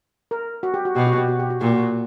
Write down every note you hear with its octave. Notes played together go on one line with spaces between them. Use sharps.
A#4
F#4
G4
F#4
B2 G4
F#4
G4
F#4
G4
F#4
A#2 G4
F#4